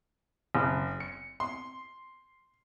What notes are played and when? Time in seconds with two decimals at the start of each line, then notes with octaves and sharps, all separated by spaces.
0.55 F#1
1.00 C#7
1.40 C6